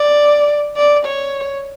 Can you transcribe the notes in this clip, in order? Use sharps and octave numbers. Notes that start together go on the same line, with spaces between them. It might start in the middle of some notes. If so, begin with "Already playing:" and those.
Already playing: D5
D5
C#5